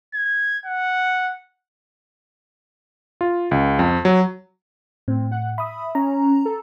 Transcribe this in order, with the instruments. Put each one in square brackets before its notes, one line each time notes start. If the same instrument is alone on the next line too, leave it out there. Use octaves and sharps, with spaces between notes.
[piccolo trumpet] G#6
F#5
[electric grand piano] F4
C#2
F2
F#3
[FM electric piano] A2 [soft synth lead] C4
[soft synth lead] F#5
[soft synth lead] E5 [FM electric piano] B5 D#6
[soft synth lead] C#4 [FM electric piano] A#5
[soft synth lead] A4